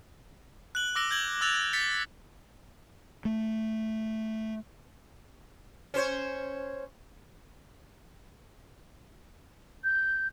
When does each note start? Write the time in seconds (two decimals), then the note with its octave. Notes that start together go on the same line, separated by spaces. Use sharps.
0.75 F#6 F#7 G7
0.95 D6 E6 A#6 D7 F#7 G7
1.11 G6 G#6 F#7 G7
1.41 D6 E6 F#6 A6 F7
1.73 A6 B6 C#7 F7 G7
3.25 A3
5.94 C#4 C5 C#5
9.84 G6